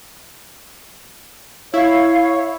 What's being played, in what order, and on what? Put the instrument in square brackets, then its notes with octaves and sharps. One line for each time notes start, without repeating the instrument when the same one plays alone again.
[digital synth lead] E4 [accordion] C#5 [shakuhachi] F5